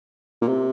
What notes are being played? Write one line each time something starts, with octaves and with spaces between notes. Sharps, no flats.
A#2
C3